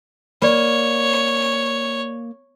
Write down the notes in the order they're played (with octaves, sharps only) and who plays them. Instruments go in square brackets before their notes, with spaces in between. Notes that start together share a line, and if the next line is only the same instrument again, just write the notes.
[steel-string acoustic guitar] A#3 [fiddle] C#5 [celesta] D5 B5